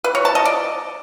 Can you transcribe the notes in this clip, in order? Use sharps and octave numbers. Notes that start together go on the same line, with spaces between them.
B4
C#5
A5
D#5
D5